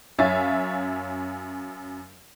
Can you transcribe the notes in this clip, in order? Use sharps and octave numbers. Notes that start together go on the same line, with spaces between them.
F#2 C#5 E5 F5 G#5 A6